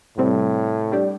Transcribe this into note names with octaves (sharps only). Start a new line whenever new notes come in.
A2 C3 G3 C4
G3 D4 G4